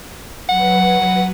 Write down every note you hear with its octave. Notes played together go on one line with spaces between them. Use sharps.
F#3 B4 F#5